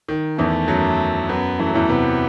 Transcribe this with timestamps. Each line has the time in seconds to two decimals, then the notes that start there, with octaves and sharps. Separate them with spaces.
0.08 D#3
0.38 E2 E3 A3
0.68 F#2 F#3
1.29 F#2 F#3 B3
1.59 E3 A3
1.67 F#3
1.74 E2 E3
1.89 C3 B3